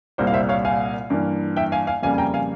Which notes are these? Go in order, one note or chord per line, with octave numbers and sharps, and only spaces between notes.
C2 A#2 G3 A#3 C5
F5
C5 E5
C#5 F5
F5 G#5
G2 E3 A#3
E5 G5
F5 G#5
F5 G#5
F2 C#3 G3 A#3 F5 G#5
G#5
G5 A#5
F5 G#5